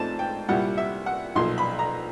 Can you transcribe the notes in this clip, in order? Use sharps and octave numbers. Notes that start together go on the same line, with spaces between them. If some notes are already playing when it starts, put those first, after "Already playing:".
Already playing: G#2 F3 A3 C4 A5
G5
C2 A#2 G3 F#5
E5
F#5
B1 A#2 F3 C6
B5
A#5